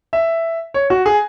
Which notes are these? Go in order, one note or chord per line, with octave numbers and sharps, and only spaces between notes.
E5
C#5
F#4
G#4